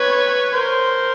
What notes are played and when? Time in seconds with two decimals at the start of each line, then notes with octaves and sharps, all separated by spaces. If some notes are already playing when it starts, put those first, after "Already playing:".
Already playing: B4 C#5
0.54 A#4 C5